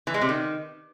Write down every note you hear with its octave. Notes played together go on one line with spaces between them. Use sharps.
E3
G#3
C3
D#3